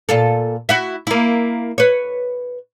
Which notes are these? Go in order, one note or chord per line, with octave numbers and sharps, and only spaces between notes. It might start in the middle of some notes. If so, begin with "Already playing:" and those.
A#2 F4 A4
E4 F#4 E5
A#3 E4
B4 C#5